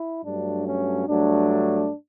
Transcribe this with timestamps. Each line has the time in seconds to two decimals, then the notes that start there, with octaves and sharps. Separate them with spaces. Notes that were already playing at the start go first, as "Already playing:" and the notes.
Already playing: E4
0.24 G2 F#3 A3 D4
0.66 C#4
1.07 G2 F#3 A3 D4